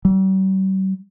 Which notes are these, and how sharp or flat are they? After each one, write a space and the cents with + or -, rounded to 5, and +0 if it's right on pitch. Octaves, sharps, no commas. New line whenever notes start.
G3 -45